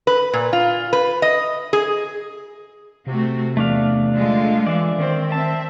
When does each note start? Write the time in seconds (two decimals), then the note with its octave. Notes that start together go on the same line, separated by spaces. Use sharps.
0.07 B4
0.33 A#2
0.53 F4
0.93 B4
1.22 D#5
1.73 G#4
3.07 C3 A3 C4 F#4
3.57 E2 A3 D4 F5
4.15 D3 G#3 F4
4.67 E3 D5 E5
4.98 D#3 C4
5.32 C4 E5 A5